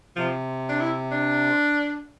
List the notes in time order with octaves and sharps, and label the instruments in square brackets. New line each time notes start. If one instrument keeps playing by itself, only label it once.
[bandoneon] C3 [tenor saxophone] F3
[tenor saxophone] D4
E4
D4